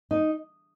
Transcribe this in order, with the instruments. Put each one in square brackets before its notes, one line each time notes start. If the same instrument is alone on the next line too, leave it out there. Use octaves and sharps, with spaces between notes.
[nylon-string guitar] D#4